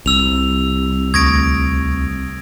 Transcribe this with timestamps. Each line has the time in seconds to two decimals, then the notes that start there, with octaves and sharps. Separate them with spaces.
0.06 C2 E6 F7
1.14 D2 C#6 D#6 G#6 A#6 D7